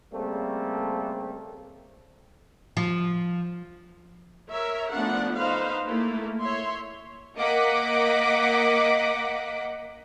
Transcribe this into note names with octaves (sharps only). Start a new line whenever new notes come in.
C#3 G3 A3 A#3 C4
F3
A#4 C#5 E5
F3 A3 B3 C#4 D4 F#5
D#4 B4 C5 F5
A3 A#3 E4
C#5 E5 C6
A#3 D#5 F#5 D6 B6